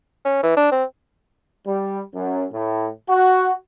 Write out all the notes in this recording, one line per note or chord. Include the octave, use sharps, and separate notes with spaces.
C#4
E3
D4
C4
G3
F#2
A2
F#4